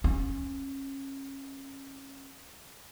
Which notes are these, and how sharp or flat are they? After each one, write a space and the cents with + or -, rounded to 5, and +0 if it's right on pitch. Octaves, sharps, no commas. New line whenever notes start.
C#4 -25